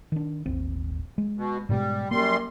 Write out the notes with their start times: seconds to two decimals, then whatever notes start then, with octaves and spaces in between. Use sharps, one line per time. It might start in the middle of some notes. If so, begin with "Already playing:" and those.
0.12 D#3 D4
0.46 D#1 G#1 C4
1.18 G#3
1.37 B2
1.69 G#2 B2 G3 G#3
2.11 F#2 G3 A#3 C6